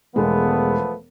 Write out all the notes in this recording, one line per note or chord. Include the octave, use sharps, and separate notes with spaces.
E1 F3 G#3 A3 B3